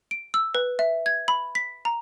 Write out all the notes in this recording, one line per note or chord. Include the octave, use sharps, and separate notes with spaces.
D7
E6
B4
E5
G#6
B5
B6
A#5